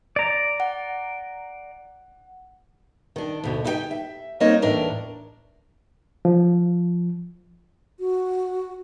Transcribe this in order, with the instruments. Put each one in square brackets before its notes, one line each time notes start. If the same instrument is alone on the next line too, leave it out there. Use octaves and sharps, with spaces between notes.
[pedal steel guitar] D5 A#5
[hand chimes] F#5
[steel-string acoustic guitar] D#3 D4
D2 B2 D3
D#4 E4 G4 G#4 G5 G#5
E5
G3 A#3 C4 D#4 C#5 D#5
E2 A2 D4 A#4 C#5
[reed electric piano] F3
[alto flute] F#4